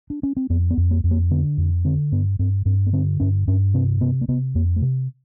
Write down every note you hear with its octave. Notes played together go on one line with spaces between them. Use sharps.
D4
C#4
C4
F2 B3
B3
F2
A#3
F2
A#3
D3 B3
F2
D3 C4
G2 B3
G2 C4
G2 C4
B3
D3 C4
G2 C#4
G2 C#4
C3 C4
C3 B3
A#3
C3 B3
F2 A#3
A3
C3